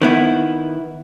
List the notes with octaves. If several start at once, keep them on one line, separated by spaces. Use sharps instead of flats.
D#3 B3 E4